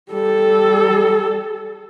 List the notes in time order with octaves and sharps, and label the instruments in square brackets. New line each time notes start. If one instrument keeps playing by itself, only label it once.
[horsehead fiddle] G3 A4